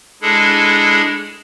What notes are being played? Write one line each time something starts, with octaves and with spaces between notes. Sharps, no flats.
G#3 D4 E4 G#4 A4